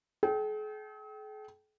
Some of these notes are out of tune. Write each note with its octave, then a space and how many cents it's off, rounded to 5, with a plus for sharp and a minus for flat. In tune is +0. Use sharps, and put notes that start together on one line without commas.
G#4 +45 G5 -20